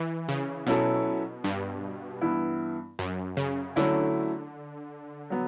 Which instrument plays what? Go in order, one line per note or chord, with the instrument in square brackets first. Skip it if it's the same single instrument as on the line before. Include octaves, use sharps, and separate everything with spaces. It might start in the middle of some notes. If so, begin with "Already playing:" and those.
Already playing: [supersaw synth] E3
C#3
[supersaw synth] B2 [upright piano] F#3 C#4 E4 A4
[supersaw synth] G2
[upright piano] G2 E3 B3 E4
[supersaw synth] F#2
C#3
[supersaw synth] D3 [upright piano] F#3 A3 C#4 E4
[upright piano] F#3 B3